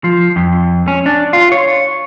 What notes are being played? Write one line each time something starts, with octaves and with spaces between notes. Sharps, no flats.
F3
F2
C#4
D4
F4
C#5